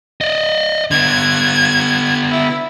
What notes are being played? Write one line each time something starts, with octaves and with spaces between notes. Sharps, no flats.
D5 D#5
D3 B3 G#6
E4